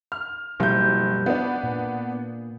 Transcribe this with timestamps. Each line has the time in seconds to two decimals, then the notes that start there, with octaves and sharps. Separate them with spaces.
0.12 F6
0.60 F#1 B2 F3 G3 G6
1.26 B3 D4
1.63 A#2